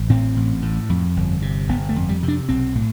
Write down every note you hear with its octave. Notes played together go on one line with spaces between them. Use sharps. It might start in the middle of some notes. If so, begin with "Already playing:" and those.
Already playing: A1
A2 C4
A1
A2
F2
G1
C3
G1 B3
A3
F2
G3
C3
D4
B1 C4
A2